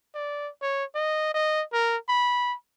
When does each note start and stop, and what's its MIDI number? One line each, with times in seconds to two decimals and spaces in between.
0.14 0.49 74
0.62 0.84 73
0.95 1.32 75
1.34 1.63 75
1.73 1.97 70
2.08 2.55 83